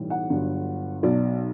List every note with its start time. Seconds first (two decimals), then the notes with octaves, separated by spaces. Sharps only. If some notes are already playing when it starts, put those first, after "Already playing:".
Already playing: B1 A2 E3 G3
0.10 F#5
0.30 G1 G2 F#3
1.03 B1 B2 F#3 D5